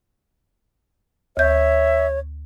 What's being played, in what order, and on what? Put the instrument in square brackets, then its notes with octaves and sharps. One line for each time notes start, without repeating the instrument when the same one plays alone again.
[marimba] D2 G6 [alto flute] C#5 [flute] E5